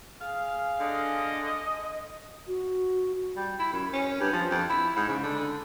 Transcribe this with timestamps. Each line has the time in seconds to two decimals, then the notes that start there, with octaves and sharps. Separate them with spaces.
0.21 G#4 F5
0.80 D3 D#5
2.47 F#4
3.36 G3
3.59 E4
3.72 F#2
3.93 C#4
4.20 G2
4.33 F3
4.50 F2
4.69 E4
4.96 G#2
5.08 C#3
5.23 D3